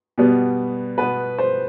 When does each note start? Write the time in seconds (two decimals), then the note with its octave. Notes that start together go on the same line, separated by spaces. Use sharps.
0.18 B2 G3 B3
0.98 B2 B3 B4
1.38 C5